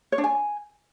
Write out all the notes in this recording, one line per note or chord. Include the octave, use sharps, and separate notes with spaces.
C#5
D4
G#5